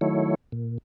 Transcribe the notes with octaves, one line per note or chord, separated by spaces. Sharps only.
D#3 F#3 A3 E4 C#5
A#2